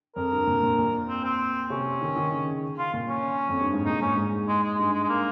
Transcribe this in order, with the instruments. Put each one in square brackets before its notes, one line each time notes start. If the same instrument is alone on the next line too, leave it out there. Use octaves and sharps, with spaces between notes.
[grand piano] F2 [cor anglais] A#4
[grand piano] G2
A#2
A#2
A#2
[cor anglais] C4
C4
[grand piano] C3 [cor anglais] C#4
[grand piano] D#3
D#3
C#3
[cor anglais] F4
[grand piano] A#2
[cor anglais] C#4
[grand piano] F2
G2
G#2
[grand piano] A#2 [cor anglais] D#4
[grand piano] G#2 [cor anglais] C#4
[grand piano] G#2
[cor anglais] G#3
G#3
[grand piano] G2 [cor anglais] G#3
[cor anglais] G#3
G#3
A#3